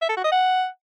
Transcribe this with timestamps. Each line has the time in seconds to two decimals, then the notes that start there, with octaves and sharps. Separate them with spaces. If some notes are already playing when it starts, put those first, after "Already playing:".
0.01 E5
0.09 A4
0.17 F#4
0.24 D#5
0.32 F#5